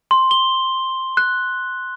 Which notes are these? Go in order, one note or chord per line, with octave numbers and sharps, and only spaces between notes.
C6
G7
F#6